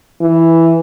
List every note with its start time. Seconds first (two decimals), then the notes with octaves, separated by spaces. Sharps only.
0.21 E3